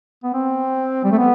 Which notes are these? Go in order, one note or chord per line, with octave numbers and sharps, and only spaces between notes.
B3
C4
G3
A3
B3